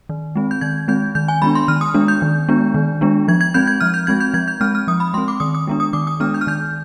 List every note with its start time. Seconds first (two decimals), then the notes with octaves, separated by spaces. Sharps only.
0.09 D#3
0.36 G#3 C4
0.51 G6
0.61 D#3 G#6
0.88 G#3 C4 G6
1.15 D#3 G6
1.28 G#5
1.42 G#3 B3 D4 B5
1.55 C6
1.68 D#3 F6
1.81 D#6
1.94 G#3 B3 D4
2.08 G6
2.22 D#3
2.48 G#3 B3 D4
2.74 D#3
3.01 G#3 B3 D4
3.28 F3 G#6
3.41 G#6
3.54 G#3 C4 G6
3.67 G#6
3.81 F3 F6
3.94 G6
4.07 G#3 C4 G#6
4.20 G6
4.34 F3 G#6
4.48 G6
4.61 G#3 C4 F6
4.75 F6
4.88 F3 D#6
5.00 B5
5.14 G#3 C4 C6
5.28 D6
5.40 D#3 D#6
5.55 D#6
5.67 G#3 B3 D4
5.80 D#6
5.93 D#3 D6
6.07 D#6
6.20 G#3 B3 D4 F6
6.34 G6
6.41 F6
6.47 D#3 G6